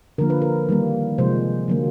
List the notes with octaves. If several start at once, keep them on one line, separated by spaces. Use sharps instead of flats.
D3 F3 A#3 A#4
B4
A#4
D#3 G3 A#3
C3 F3 G#3 C5
D3 F#3 A#3